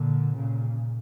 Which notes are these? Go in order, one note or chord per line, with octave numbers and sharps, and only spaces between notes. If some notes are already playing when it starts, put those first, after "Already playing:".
Already playing: A#2 D3
A#2 C#3